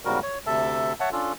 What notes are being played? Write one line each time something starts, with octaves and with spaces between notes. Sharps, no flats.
E2 G#2 C#3 G3 F#4 A#4
C#5
D2 C3 A4 E5 A5
C#5 E5 F#5 A5
C#4 D4 F4 A4